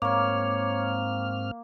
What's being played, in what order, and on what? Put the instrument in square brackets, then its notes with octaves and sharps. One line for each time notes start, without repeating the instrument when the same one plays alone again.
[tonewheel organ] G#2 C4 F6 [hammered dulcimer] A#3 [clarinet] C#5 [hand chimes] C#6 D6